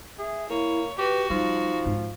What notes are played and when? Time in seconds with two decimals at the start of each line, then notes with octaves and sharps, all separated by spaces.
0.19 G#4 E5
0.50 A#3 E4 C#5
0.98 F#4 G4 B4
1.30 F3 G3 D#4
1.85 G#2 C4